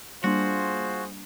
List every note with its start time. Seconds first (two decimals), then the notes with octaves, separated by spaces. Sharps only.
0.24 G3 A#3 D4 F4 F#4 G#4 C5